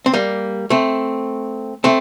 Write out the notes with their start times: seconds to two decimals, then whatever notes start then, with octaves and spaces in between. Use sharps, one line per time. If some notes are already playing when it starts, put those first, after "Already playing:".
0.06 C4
0.14 G3 A#3
0.70 A3 C4
1.84 A3 C4